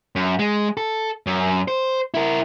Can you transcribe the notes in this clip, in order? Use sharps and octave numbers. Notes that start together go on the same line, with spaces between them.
F#2
G#3
A4
F#2
C5
E4 A#4